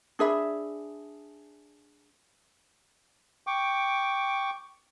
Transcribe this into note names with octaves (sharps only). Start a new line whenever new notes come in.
D4 G#4 E5 B5
G5 C#6 D6